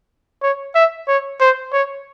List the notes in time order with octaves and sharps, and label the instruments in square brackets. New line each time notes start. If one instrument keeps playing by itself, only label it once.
[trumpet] C#5
E5
C#5
C5
C#5